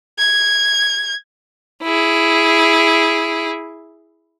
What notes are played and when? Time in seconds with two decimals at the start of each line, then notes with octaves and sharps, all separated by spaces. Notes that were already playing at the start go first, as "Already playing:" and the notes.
0.19 G#6
1.83 E4 G#4